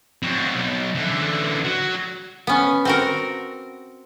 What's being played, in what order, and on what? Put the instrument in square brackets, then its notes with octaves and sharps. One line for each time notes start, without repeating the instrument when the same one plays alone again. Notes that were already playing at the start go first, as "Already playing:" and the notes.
[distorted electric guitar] F#3 C4
B1
D3 E3
F#3
[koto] B3 C#4
C4 F#4 A#4